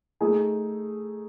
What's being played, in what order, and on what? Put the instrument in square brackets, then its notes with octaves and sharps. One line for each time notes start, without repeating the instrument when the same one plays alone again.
[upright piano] A3 D#4 G#4